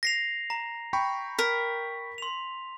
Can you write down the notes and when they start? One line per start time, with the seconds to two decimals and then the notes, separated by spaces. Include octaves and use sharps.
0.03 A#6 C7 F7
0.50 A#5
0.93 G5 B5 C#6
1.39 A#4 B6
2.18 C6 F7